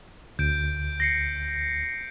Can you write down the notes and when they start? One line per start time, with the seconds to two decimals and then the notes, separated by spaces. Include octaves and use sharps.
0.39 D2 G6 D7
1.00 A#6 C7 C#7